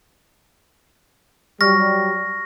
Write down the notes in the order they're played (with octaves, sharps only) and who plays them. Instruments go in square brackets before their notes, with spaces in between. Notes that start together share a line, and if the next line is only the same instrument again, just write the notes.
[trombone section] F#3 G3 [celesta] C#6 F6 [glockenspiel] A#6